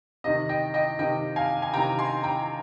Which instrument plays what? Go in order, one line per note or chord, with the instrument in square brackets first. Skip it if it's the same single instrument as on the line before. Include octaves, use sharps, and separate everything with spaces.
[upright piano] C3 D#3 D#5
D#5 G5
D#5 G5
C3 D#3 D#5 G5
F5 G#5
G#5
C3 D#3 G5 A#5
G#5 C6
G5 A#5